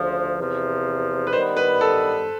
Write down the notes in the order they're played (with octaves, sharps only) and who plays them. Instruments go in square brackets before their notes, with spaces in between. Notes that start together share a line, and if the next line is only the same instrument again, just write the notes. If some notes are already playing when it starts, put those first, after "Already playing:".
Already playing: [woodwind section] D2 C#3 F3
E2 C3 F3
[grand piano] B4
[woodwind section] D#3 G3 B3 [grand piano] C5
[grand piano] B4
A4